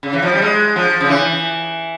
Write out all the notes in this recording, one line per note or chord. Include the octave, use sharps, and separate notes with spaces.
C#3
E3
F3
G3
G#3
F3
C#3
E3